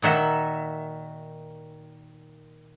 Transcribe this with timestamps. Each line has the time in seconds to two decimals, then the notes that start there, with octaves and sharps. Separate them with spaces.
0.02 A#2 D#3 F#4 E5